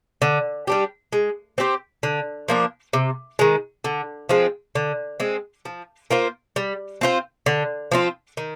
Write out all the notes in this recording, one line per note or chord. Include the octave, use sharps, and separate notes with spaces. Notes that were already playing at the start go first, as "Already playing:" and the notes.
D3
G3 D4 G4
G#3
C4 G4 C5
D3
F3 A#3 D4
C3
D#3 G#3
D3
F3 G#3 C4
D3
G#3 C4
F3
A#3 F4 C5
G3
C4 F4 C5
D3
F3 C4 F4
D#3